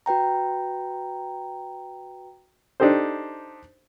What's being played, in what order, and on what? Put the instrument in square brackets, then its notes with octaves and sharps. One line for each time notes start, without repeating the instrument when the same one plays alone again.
[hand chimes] F#4 B4 G5 A#5
[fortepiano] D4 D#4 G4 A4 C5